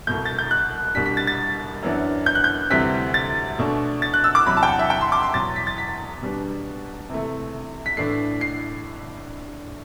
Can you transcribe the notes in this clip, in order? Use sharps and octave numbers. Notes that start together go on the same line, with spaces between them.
C2 B2 A3 G6
A6
G6
F#6
C2 B2 G3 D4 B6
B6
A6
A6
F#2 E3 B3 D4
G6
F#6
G6
D2 C3 E3 G3 C4 B6
A6
B2 A3 D4
A6
F#6
E6
D6
E2 C3 F#3 B5
A5
G5
F#5
E5
G5
C6
D6
C6
E2 B2 F#3 A6
B6
A6
B6
B2 G3 B3 D4
C3 E3 A3
B6
A2 E3 A3 D4 C7
C7